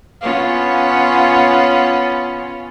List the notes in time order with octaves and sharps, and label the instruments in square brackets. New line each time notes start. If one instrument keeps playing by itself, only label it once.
[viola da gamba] B3 C#4 F4